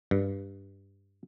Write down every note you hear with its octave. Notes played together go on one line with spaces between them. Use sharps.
G2